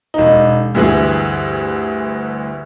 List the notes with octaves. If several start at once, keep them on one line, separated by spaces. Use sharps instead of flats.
E1 D#4
D2 G2 E3 G#4